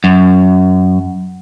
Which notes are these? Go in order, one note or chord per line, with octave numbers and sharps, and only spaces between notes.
F#2